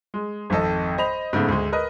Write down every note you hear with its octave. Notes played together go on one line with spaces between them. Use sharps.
G#3
G#1 F2 A4 D#5
C5 D#5 B5 F7
G#2 C#3 A3 B3
D2 G#3
A#4 B4 D#5